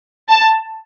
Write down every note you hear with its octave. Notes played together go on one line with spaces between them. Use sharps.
A5